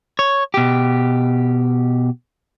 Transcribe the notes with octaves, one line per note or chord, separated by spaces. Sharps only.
C#5
B2 G4